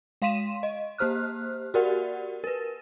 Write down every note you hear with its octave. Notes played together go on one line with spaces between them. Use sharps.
G#3 F5 C6 B6 D#7 E7
D#5
A#3 G4 C5 F6 F#6
F#4 G4 A#4 D5 F#5
A#4 B4